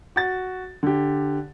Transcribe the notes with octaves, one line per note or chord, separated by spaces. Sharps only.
F#4 A6
D3 G4